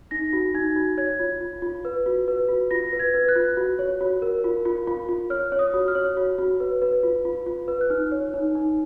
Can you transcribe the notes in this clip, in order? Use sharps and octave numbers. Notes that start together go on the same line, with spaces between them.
D#4 A#6
F#4
D#4 G#6
F#4
C#5 G#6
F4
F4
F4
B4
F#4
B4
F#4
F4 A#6
B4
G#6
B4
F#6
F4
F#4
C#5
F#4
A#4
F4
F4
F4
F4
C#5 F6
C#5
D#6
F#4
F6
C#5
F#4
F#4
B4
B4
F4
F4
F4
B4
F#6
D#4 F6
C#5
D#4
D#4